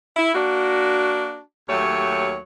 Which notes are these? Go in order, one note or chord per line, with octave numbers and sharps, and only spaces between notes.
E4
A#3 D4 F#4
D#2 F#3 A3 G4 C#5